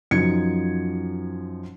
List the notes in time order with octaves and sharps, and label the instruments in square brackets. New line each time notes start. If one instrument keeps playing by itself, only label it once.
[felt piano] F#2 F3 D#4 G#6 C#7